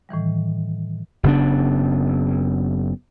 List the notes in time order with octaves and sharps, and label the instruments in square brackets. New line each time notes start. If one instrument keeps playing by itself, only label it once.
[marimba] A2 D#3 E3 G3
[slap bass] F#1 C#3 B3 D4